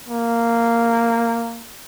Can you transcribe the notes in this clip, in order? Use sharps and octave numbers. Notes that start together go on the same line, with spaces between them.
A#3